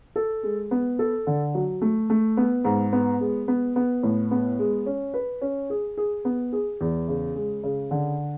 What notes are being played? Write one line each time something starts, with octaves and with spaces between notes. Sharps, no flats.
A4
G#3
B3
A4
D3
F#3
A3
A3
B3
G#2
B3
G#3
B3
B3
A2
B3
G#3
C#4
B4
C#4
G#4
G#4
B3
G#4
E2
C#3
G#3
C#3
D3